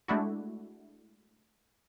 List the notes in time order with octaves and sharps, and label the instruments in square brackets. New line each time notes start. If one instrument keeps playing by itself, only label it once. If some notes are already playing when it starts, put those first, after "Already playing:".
[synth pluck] G#3 A3 D4 E4 F#4